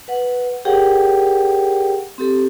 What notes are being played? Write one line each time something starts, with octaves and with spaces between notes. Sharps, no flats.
B4 F#5
G4 G#4 A#4 C#5 F#5 G5
C4 G4 A4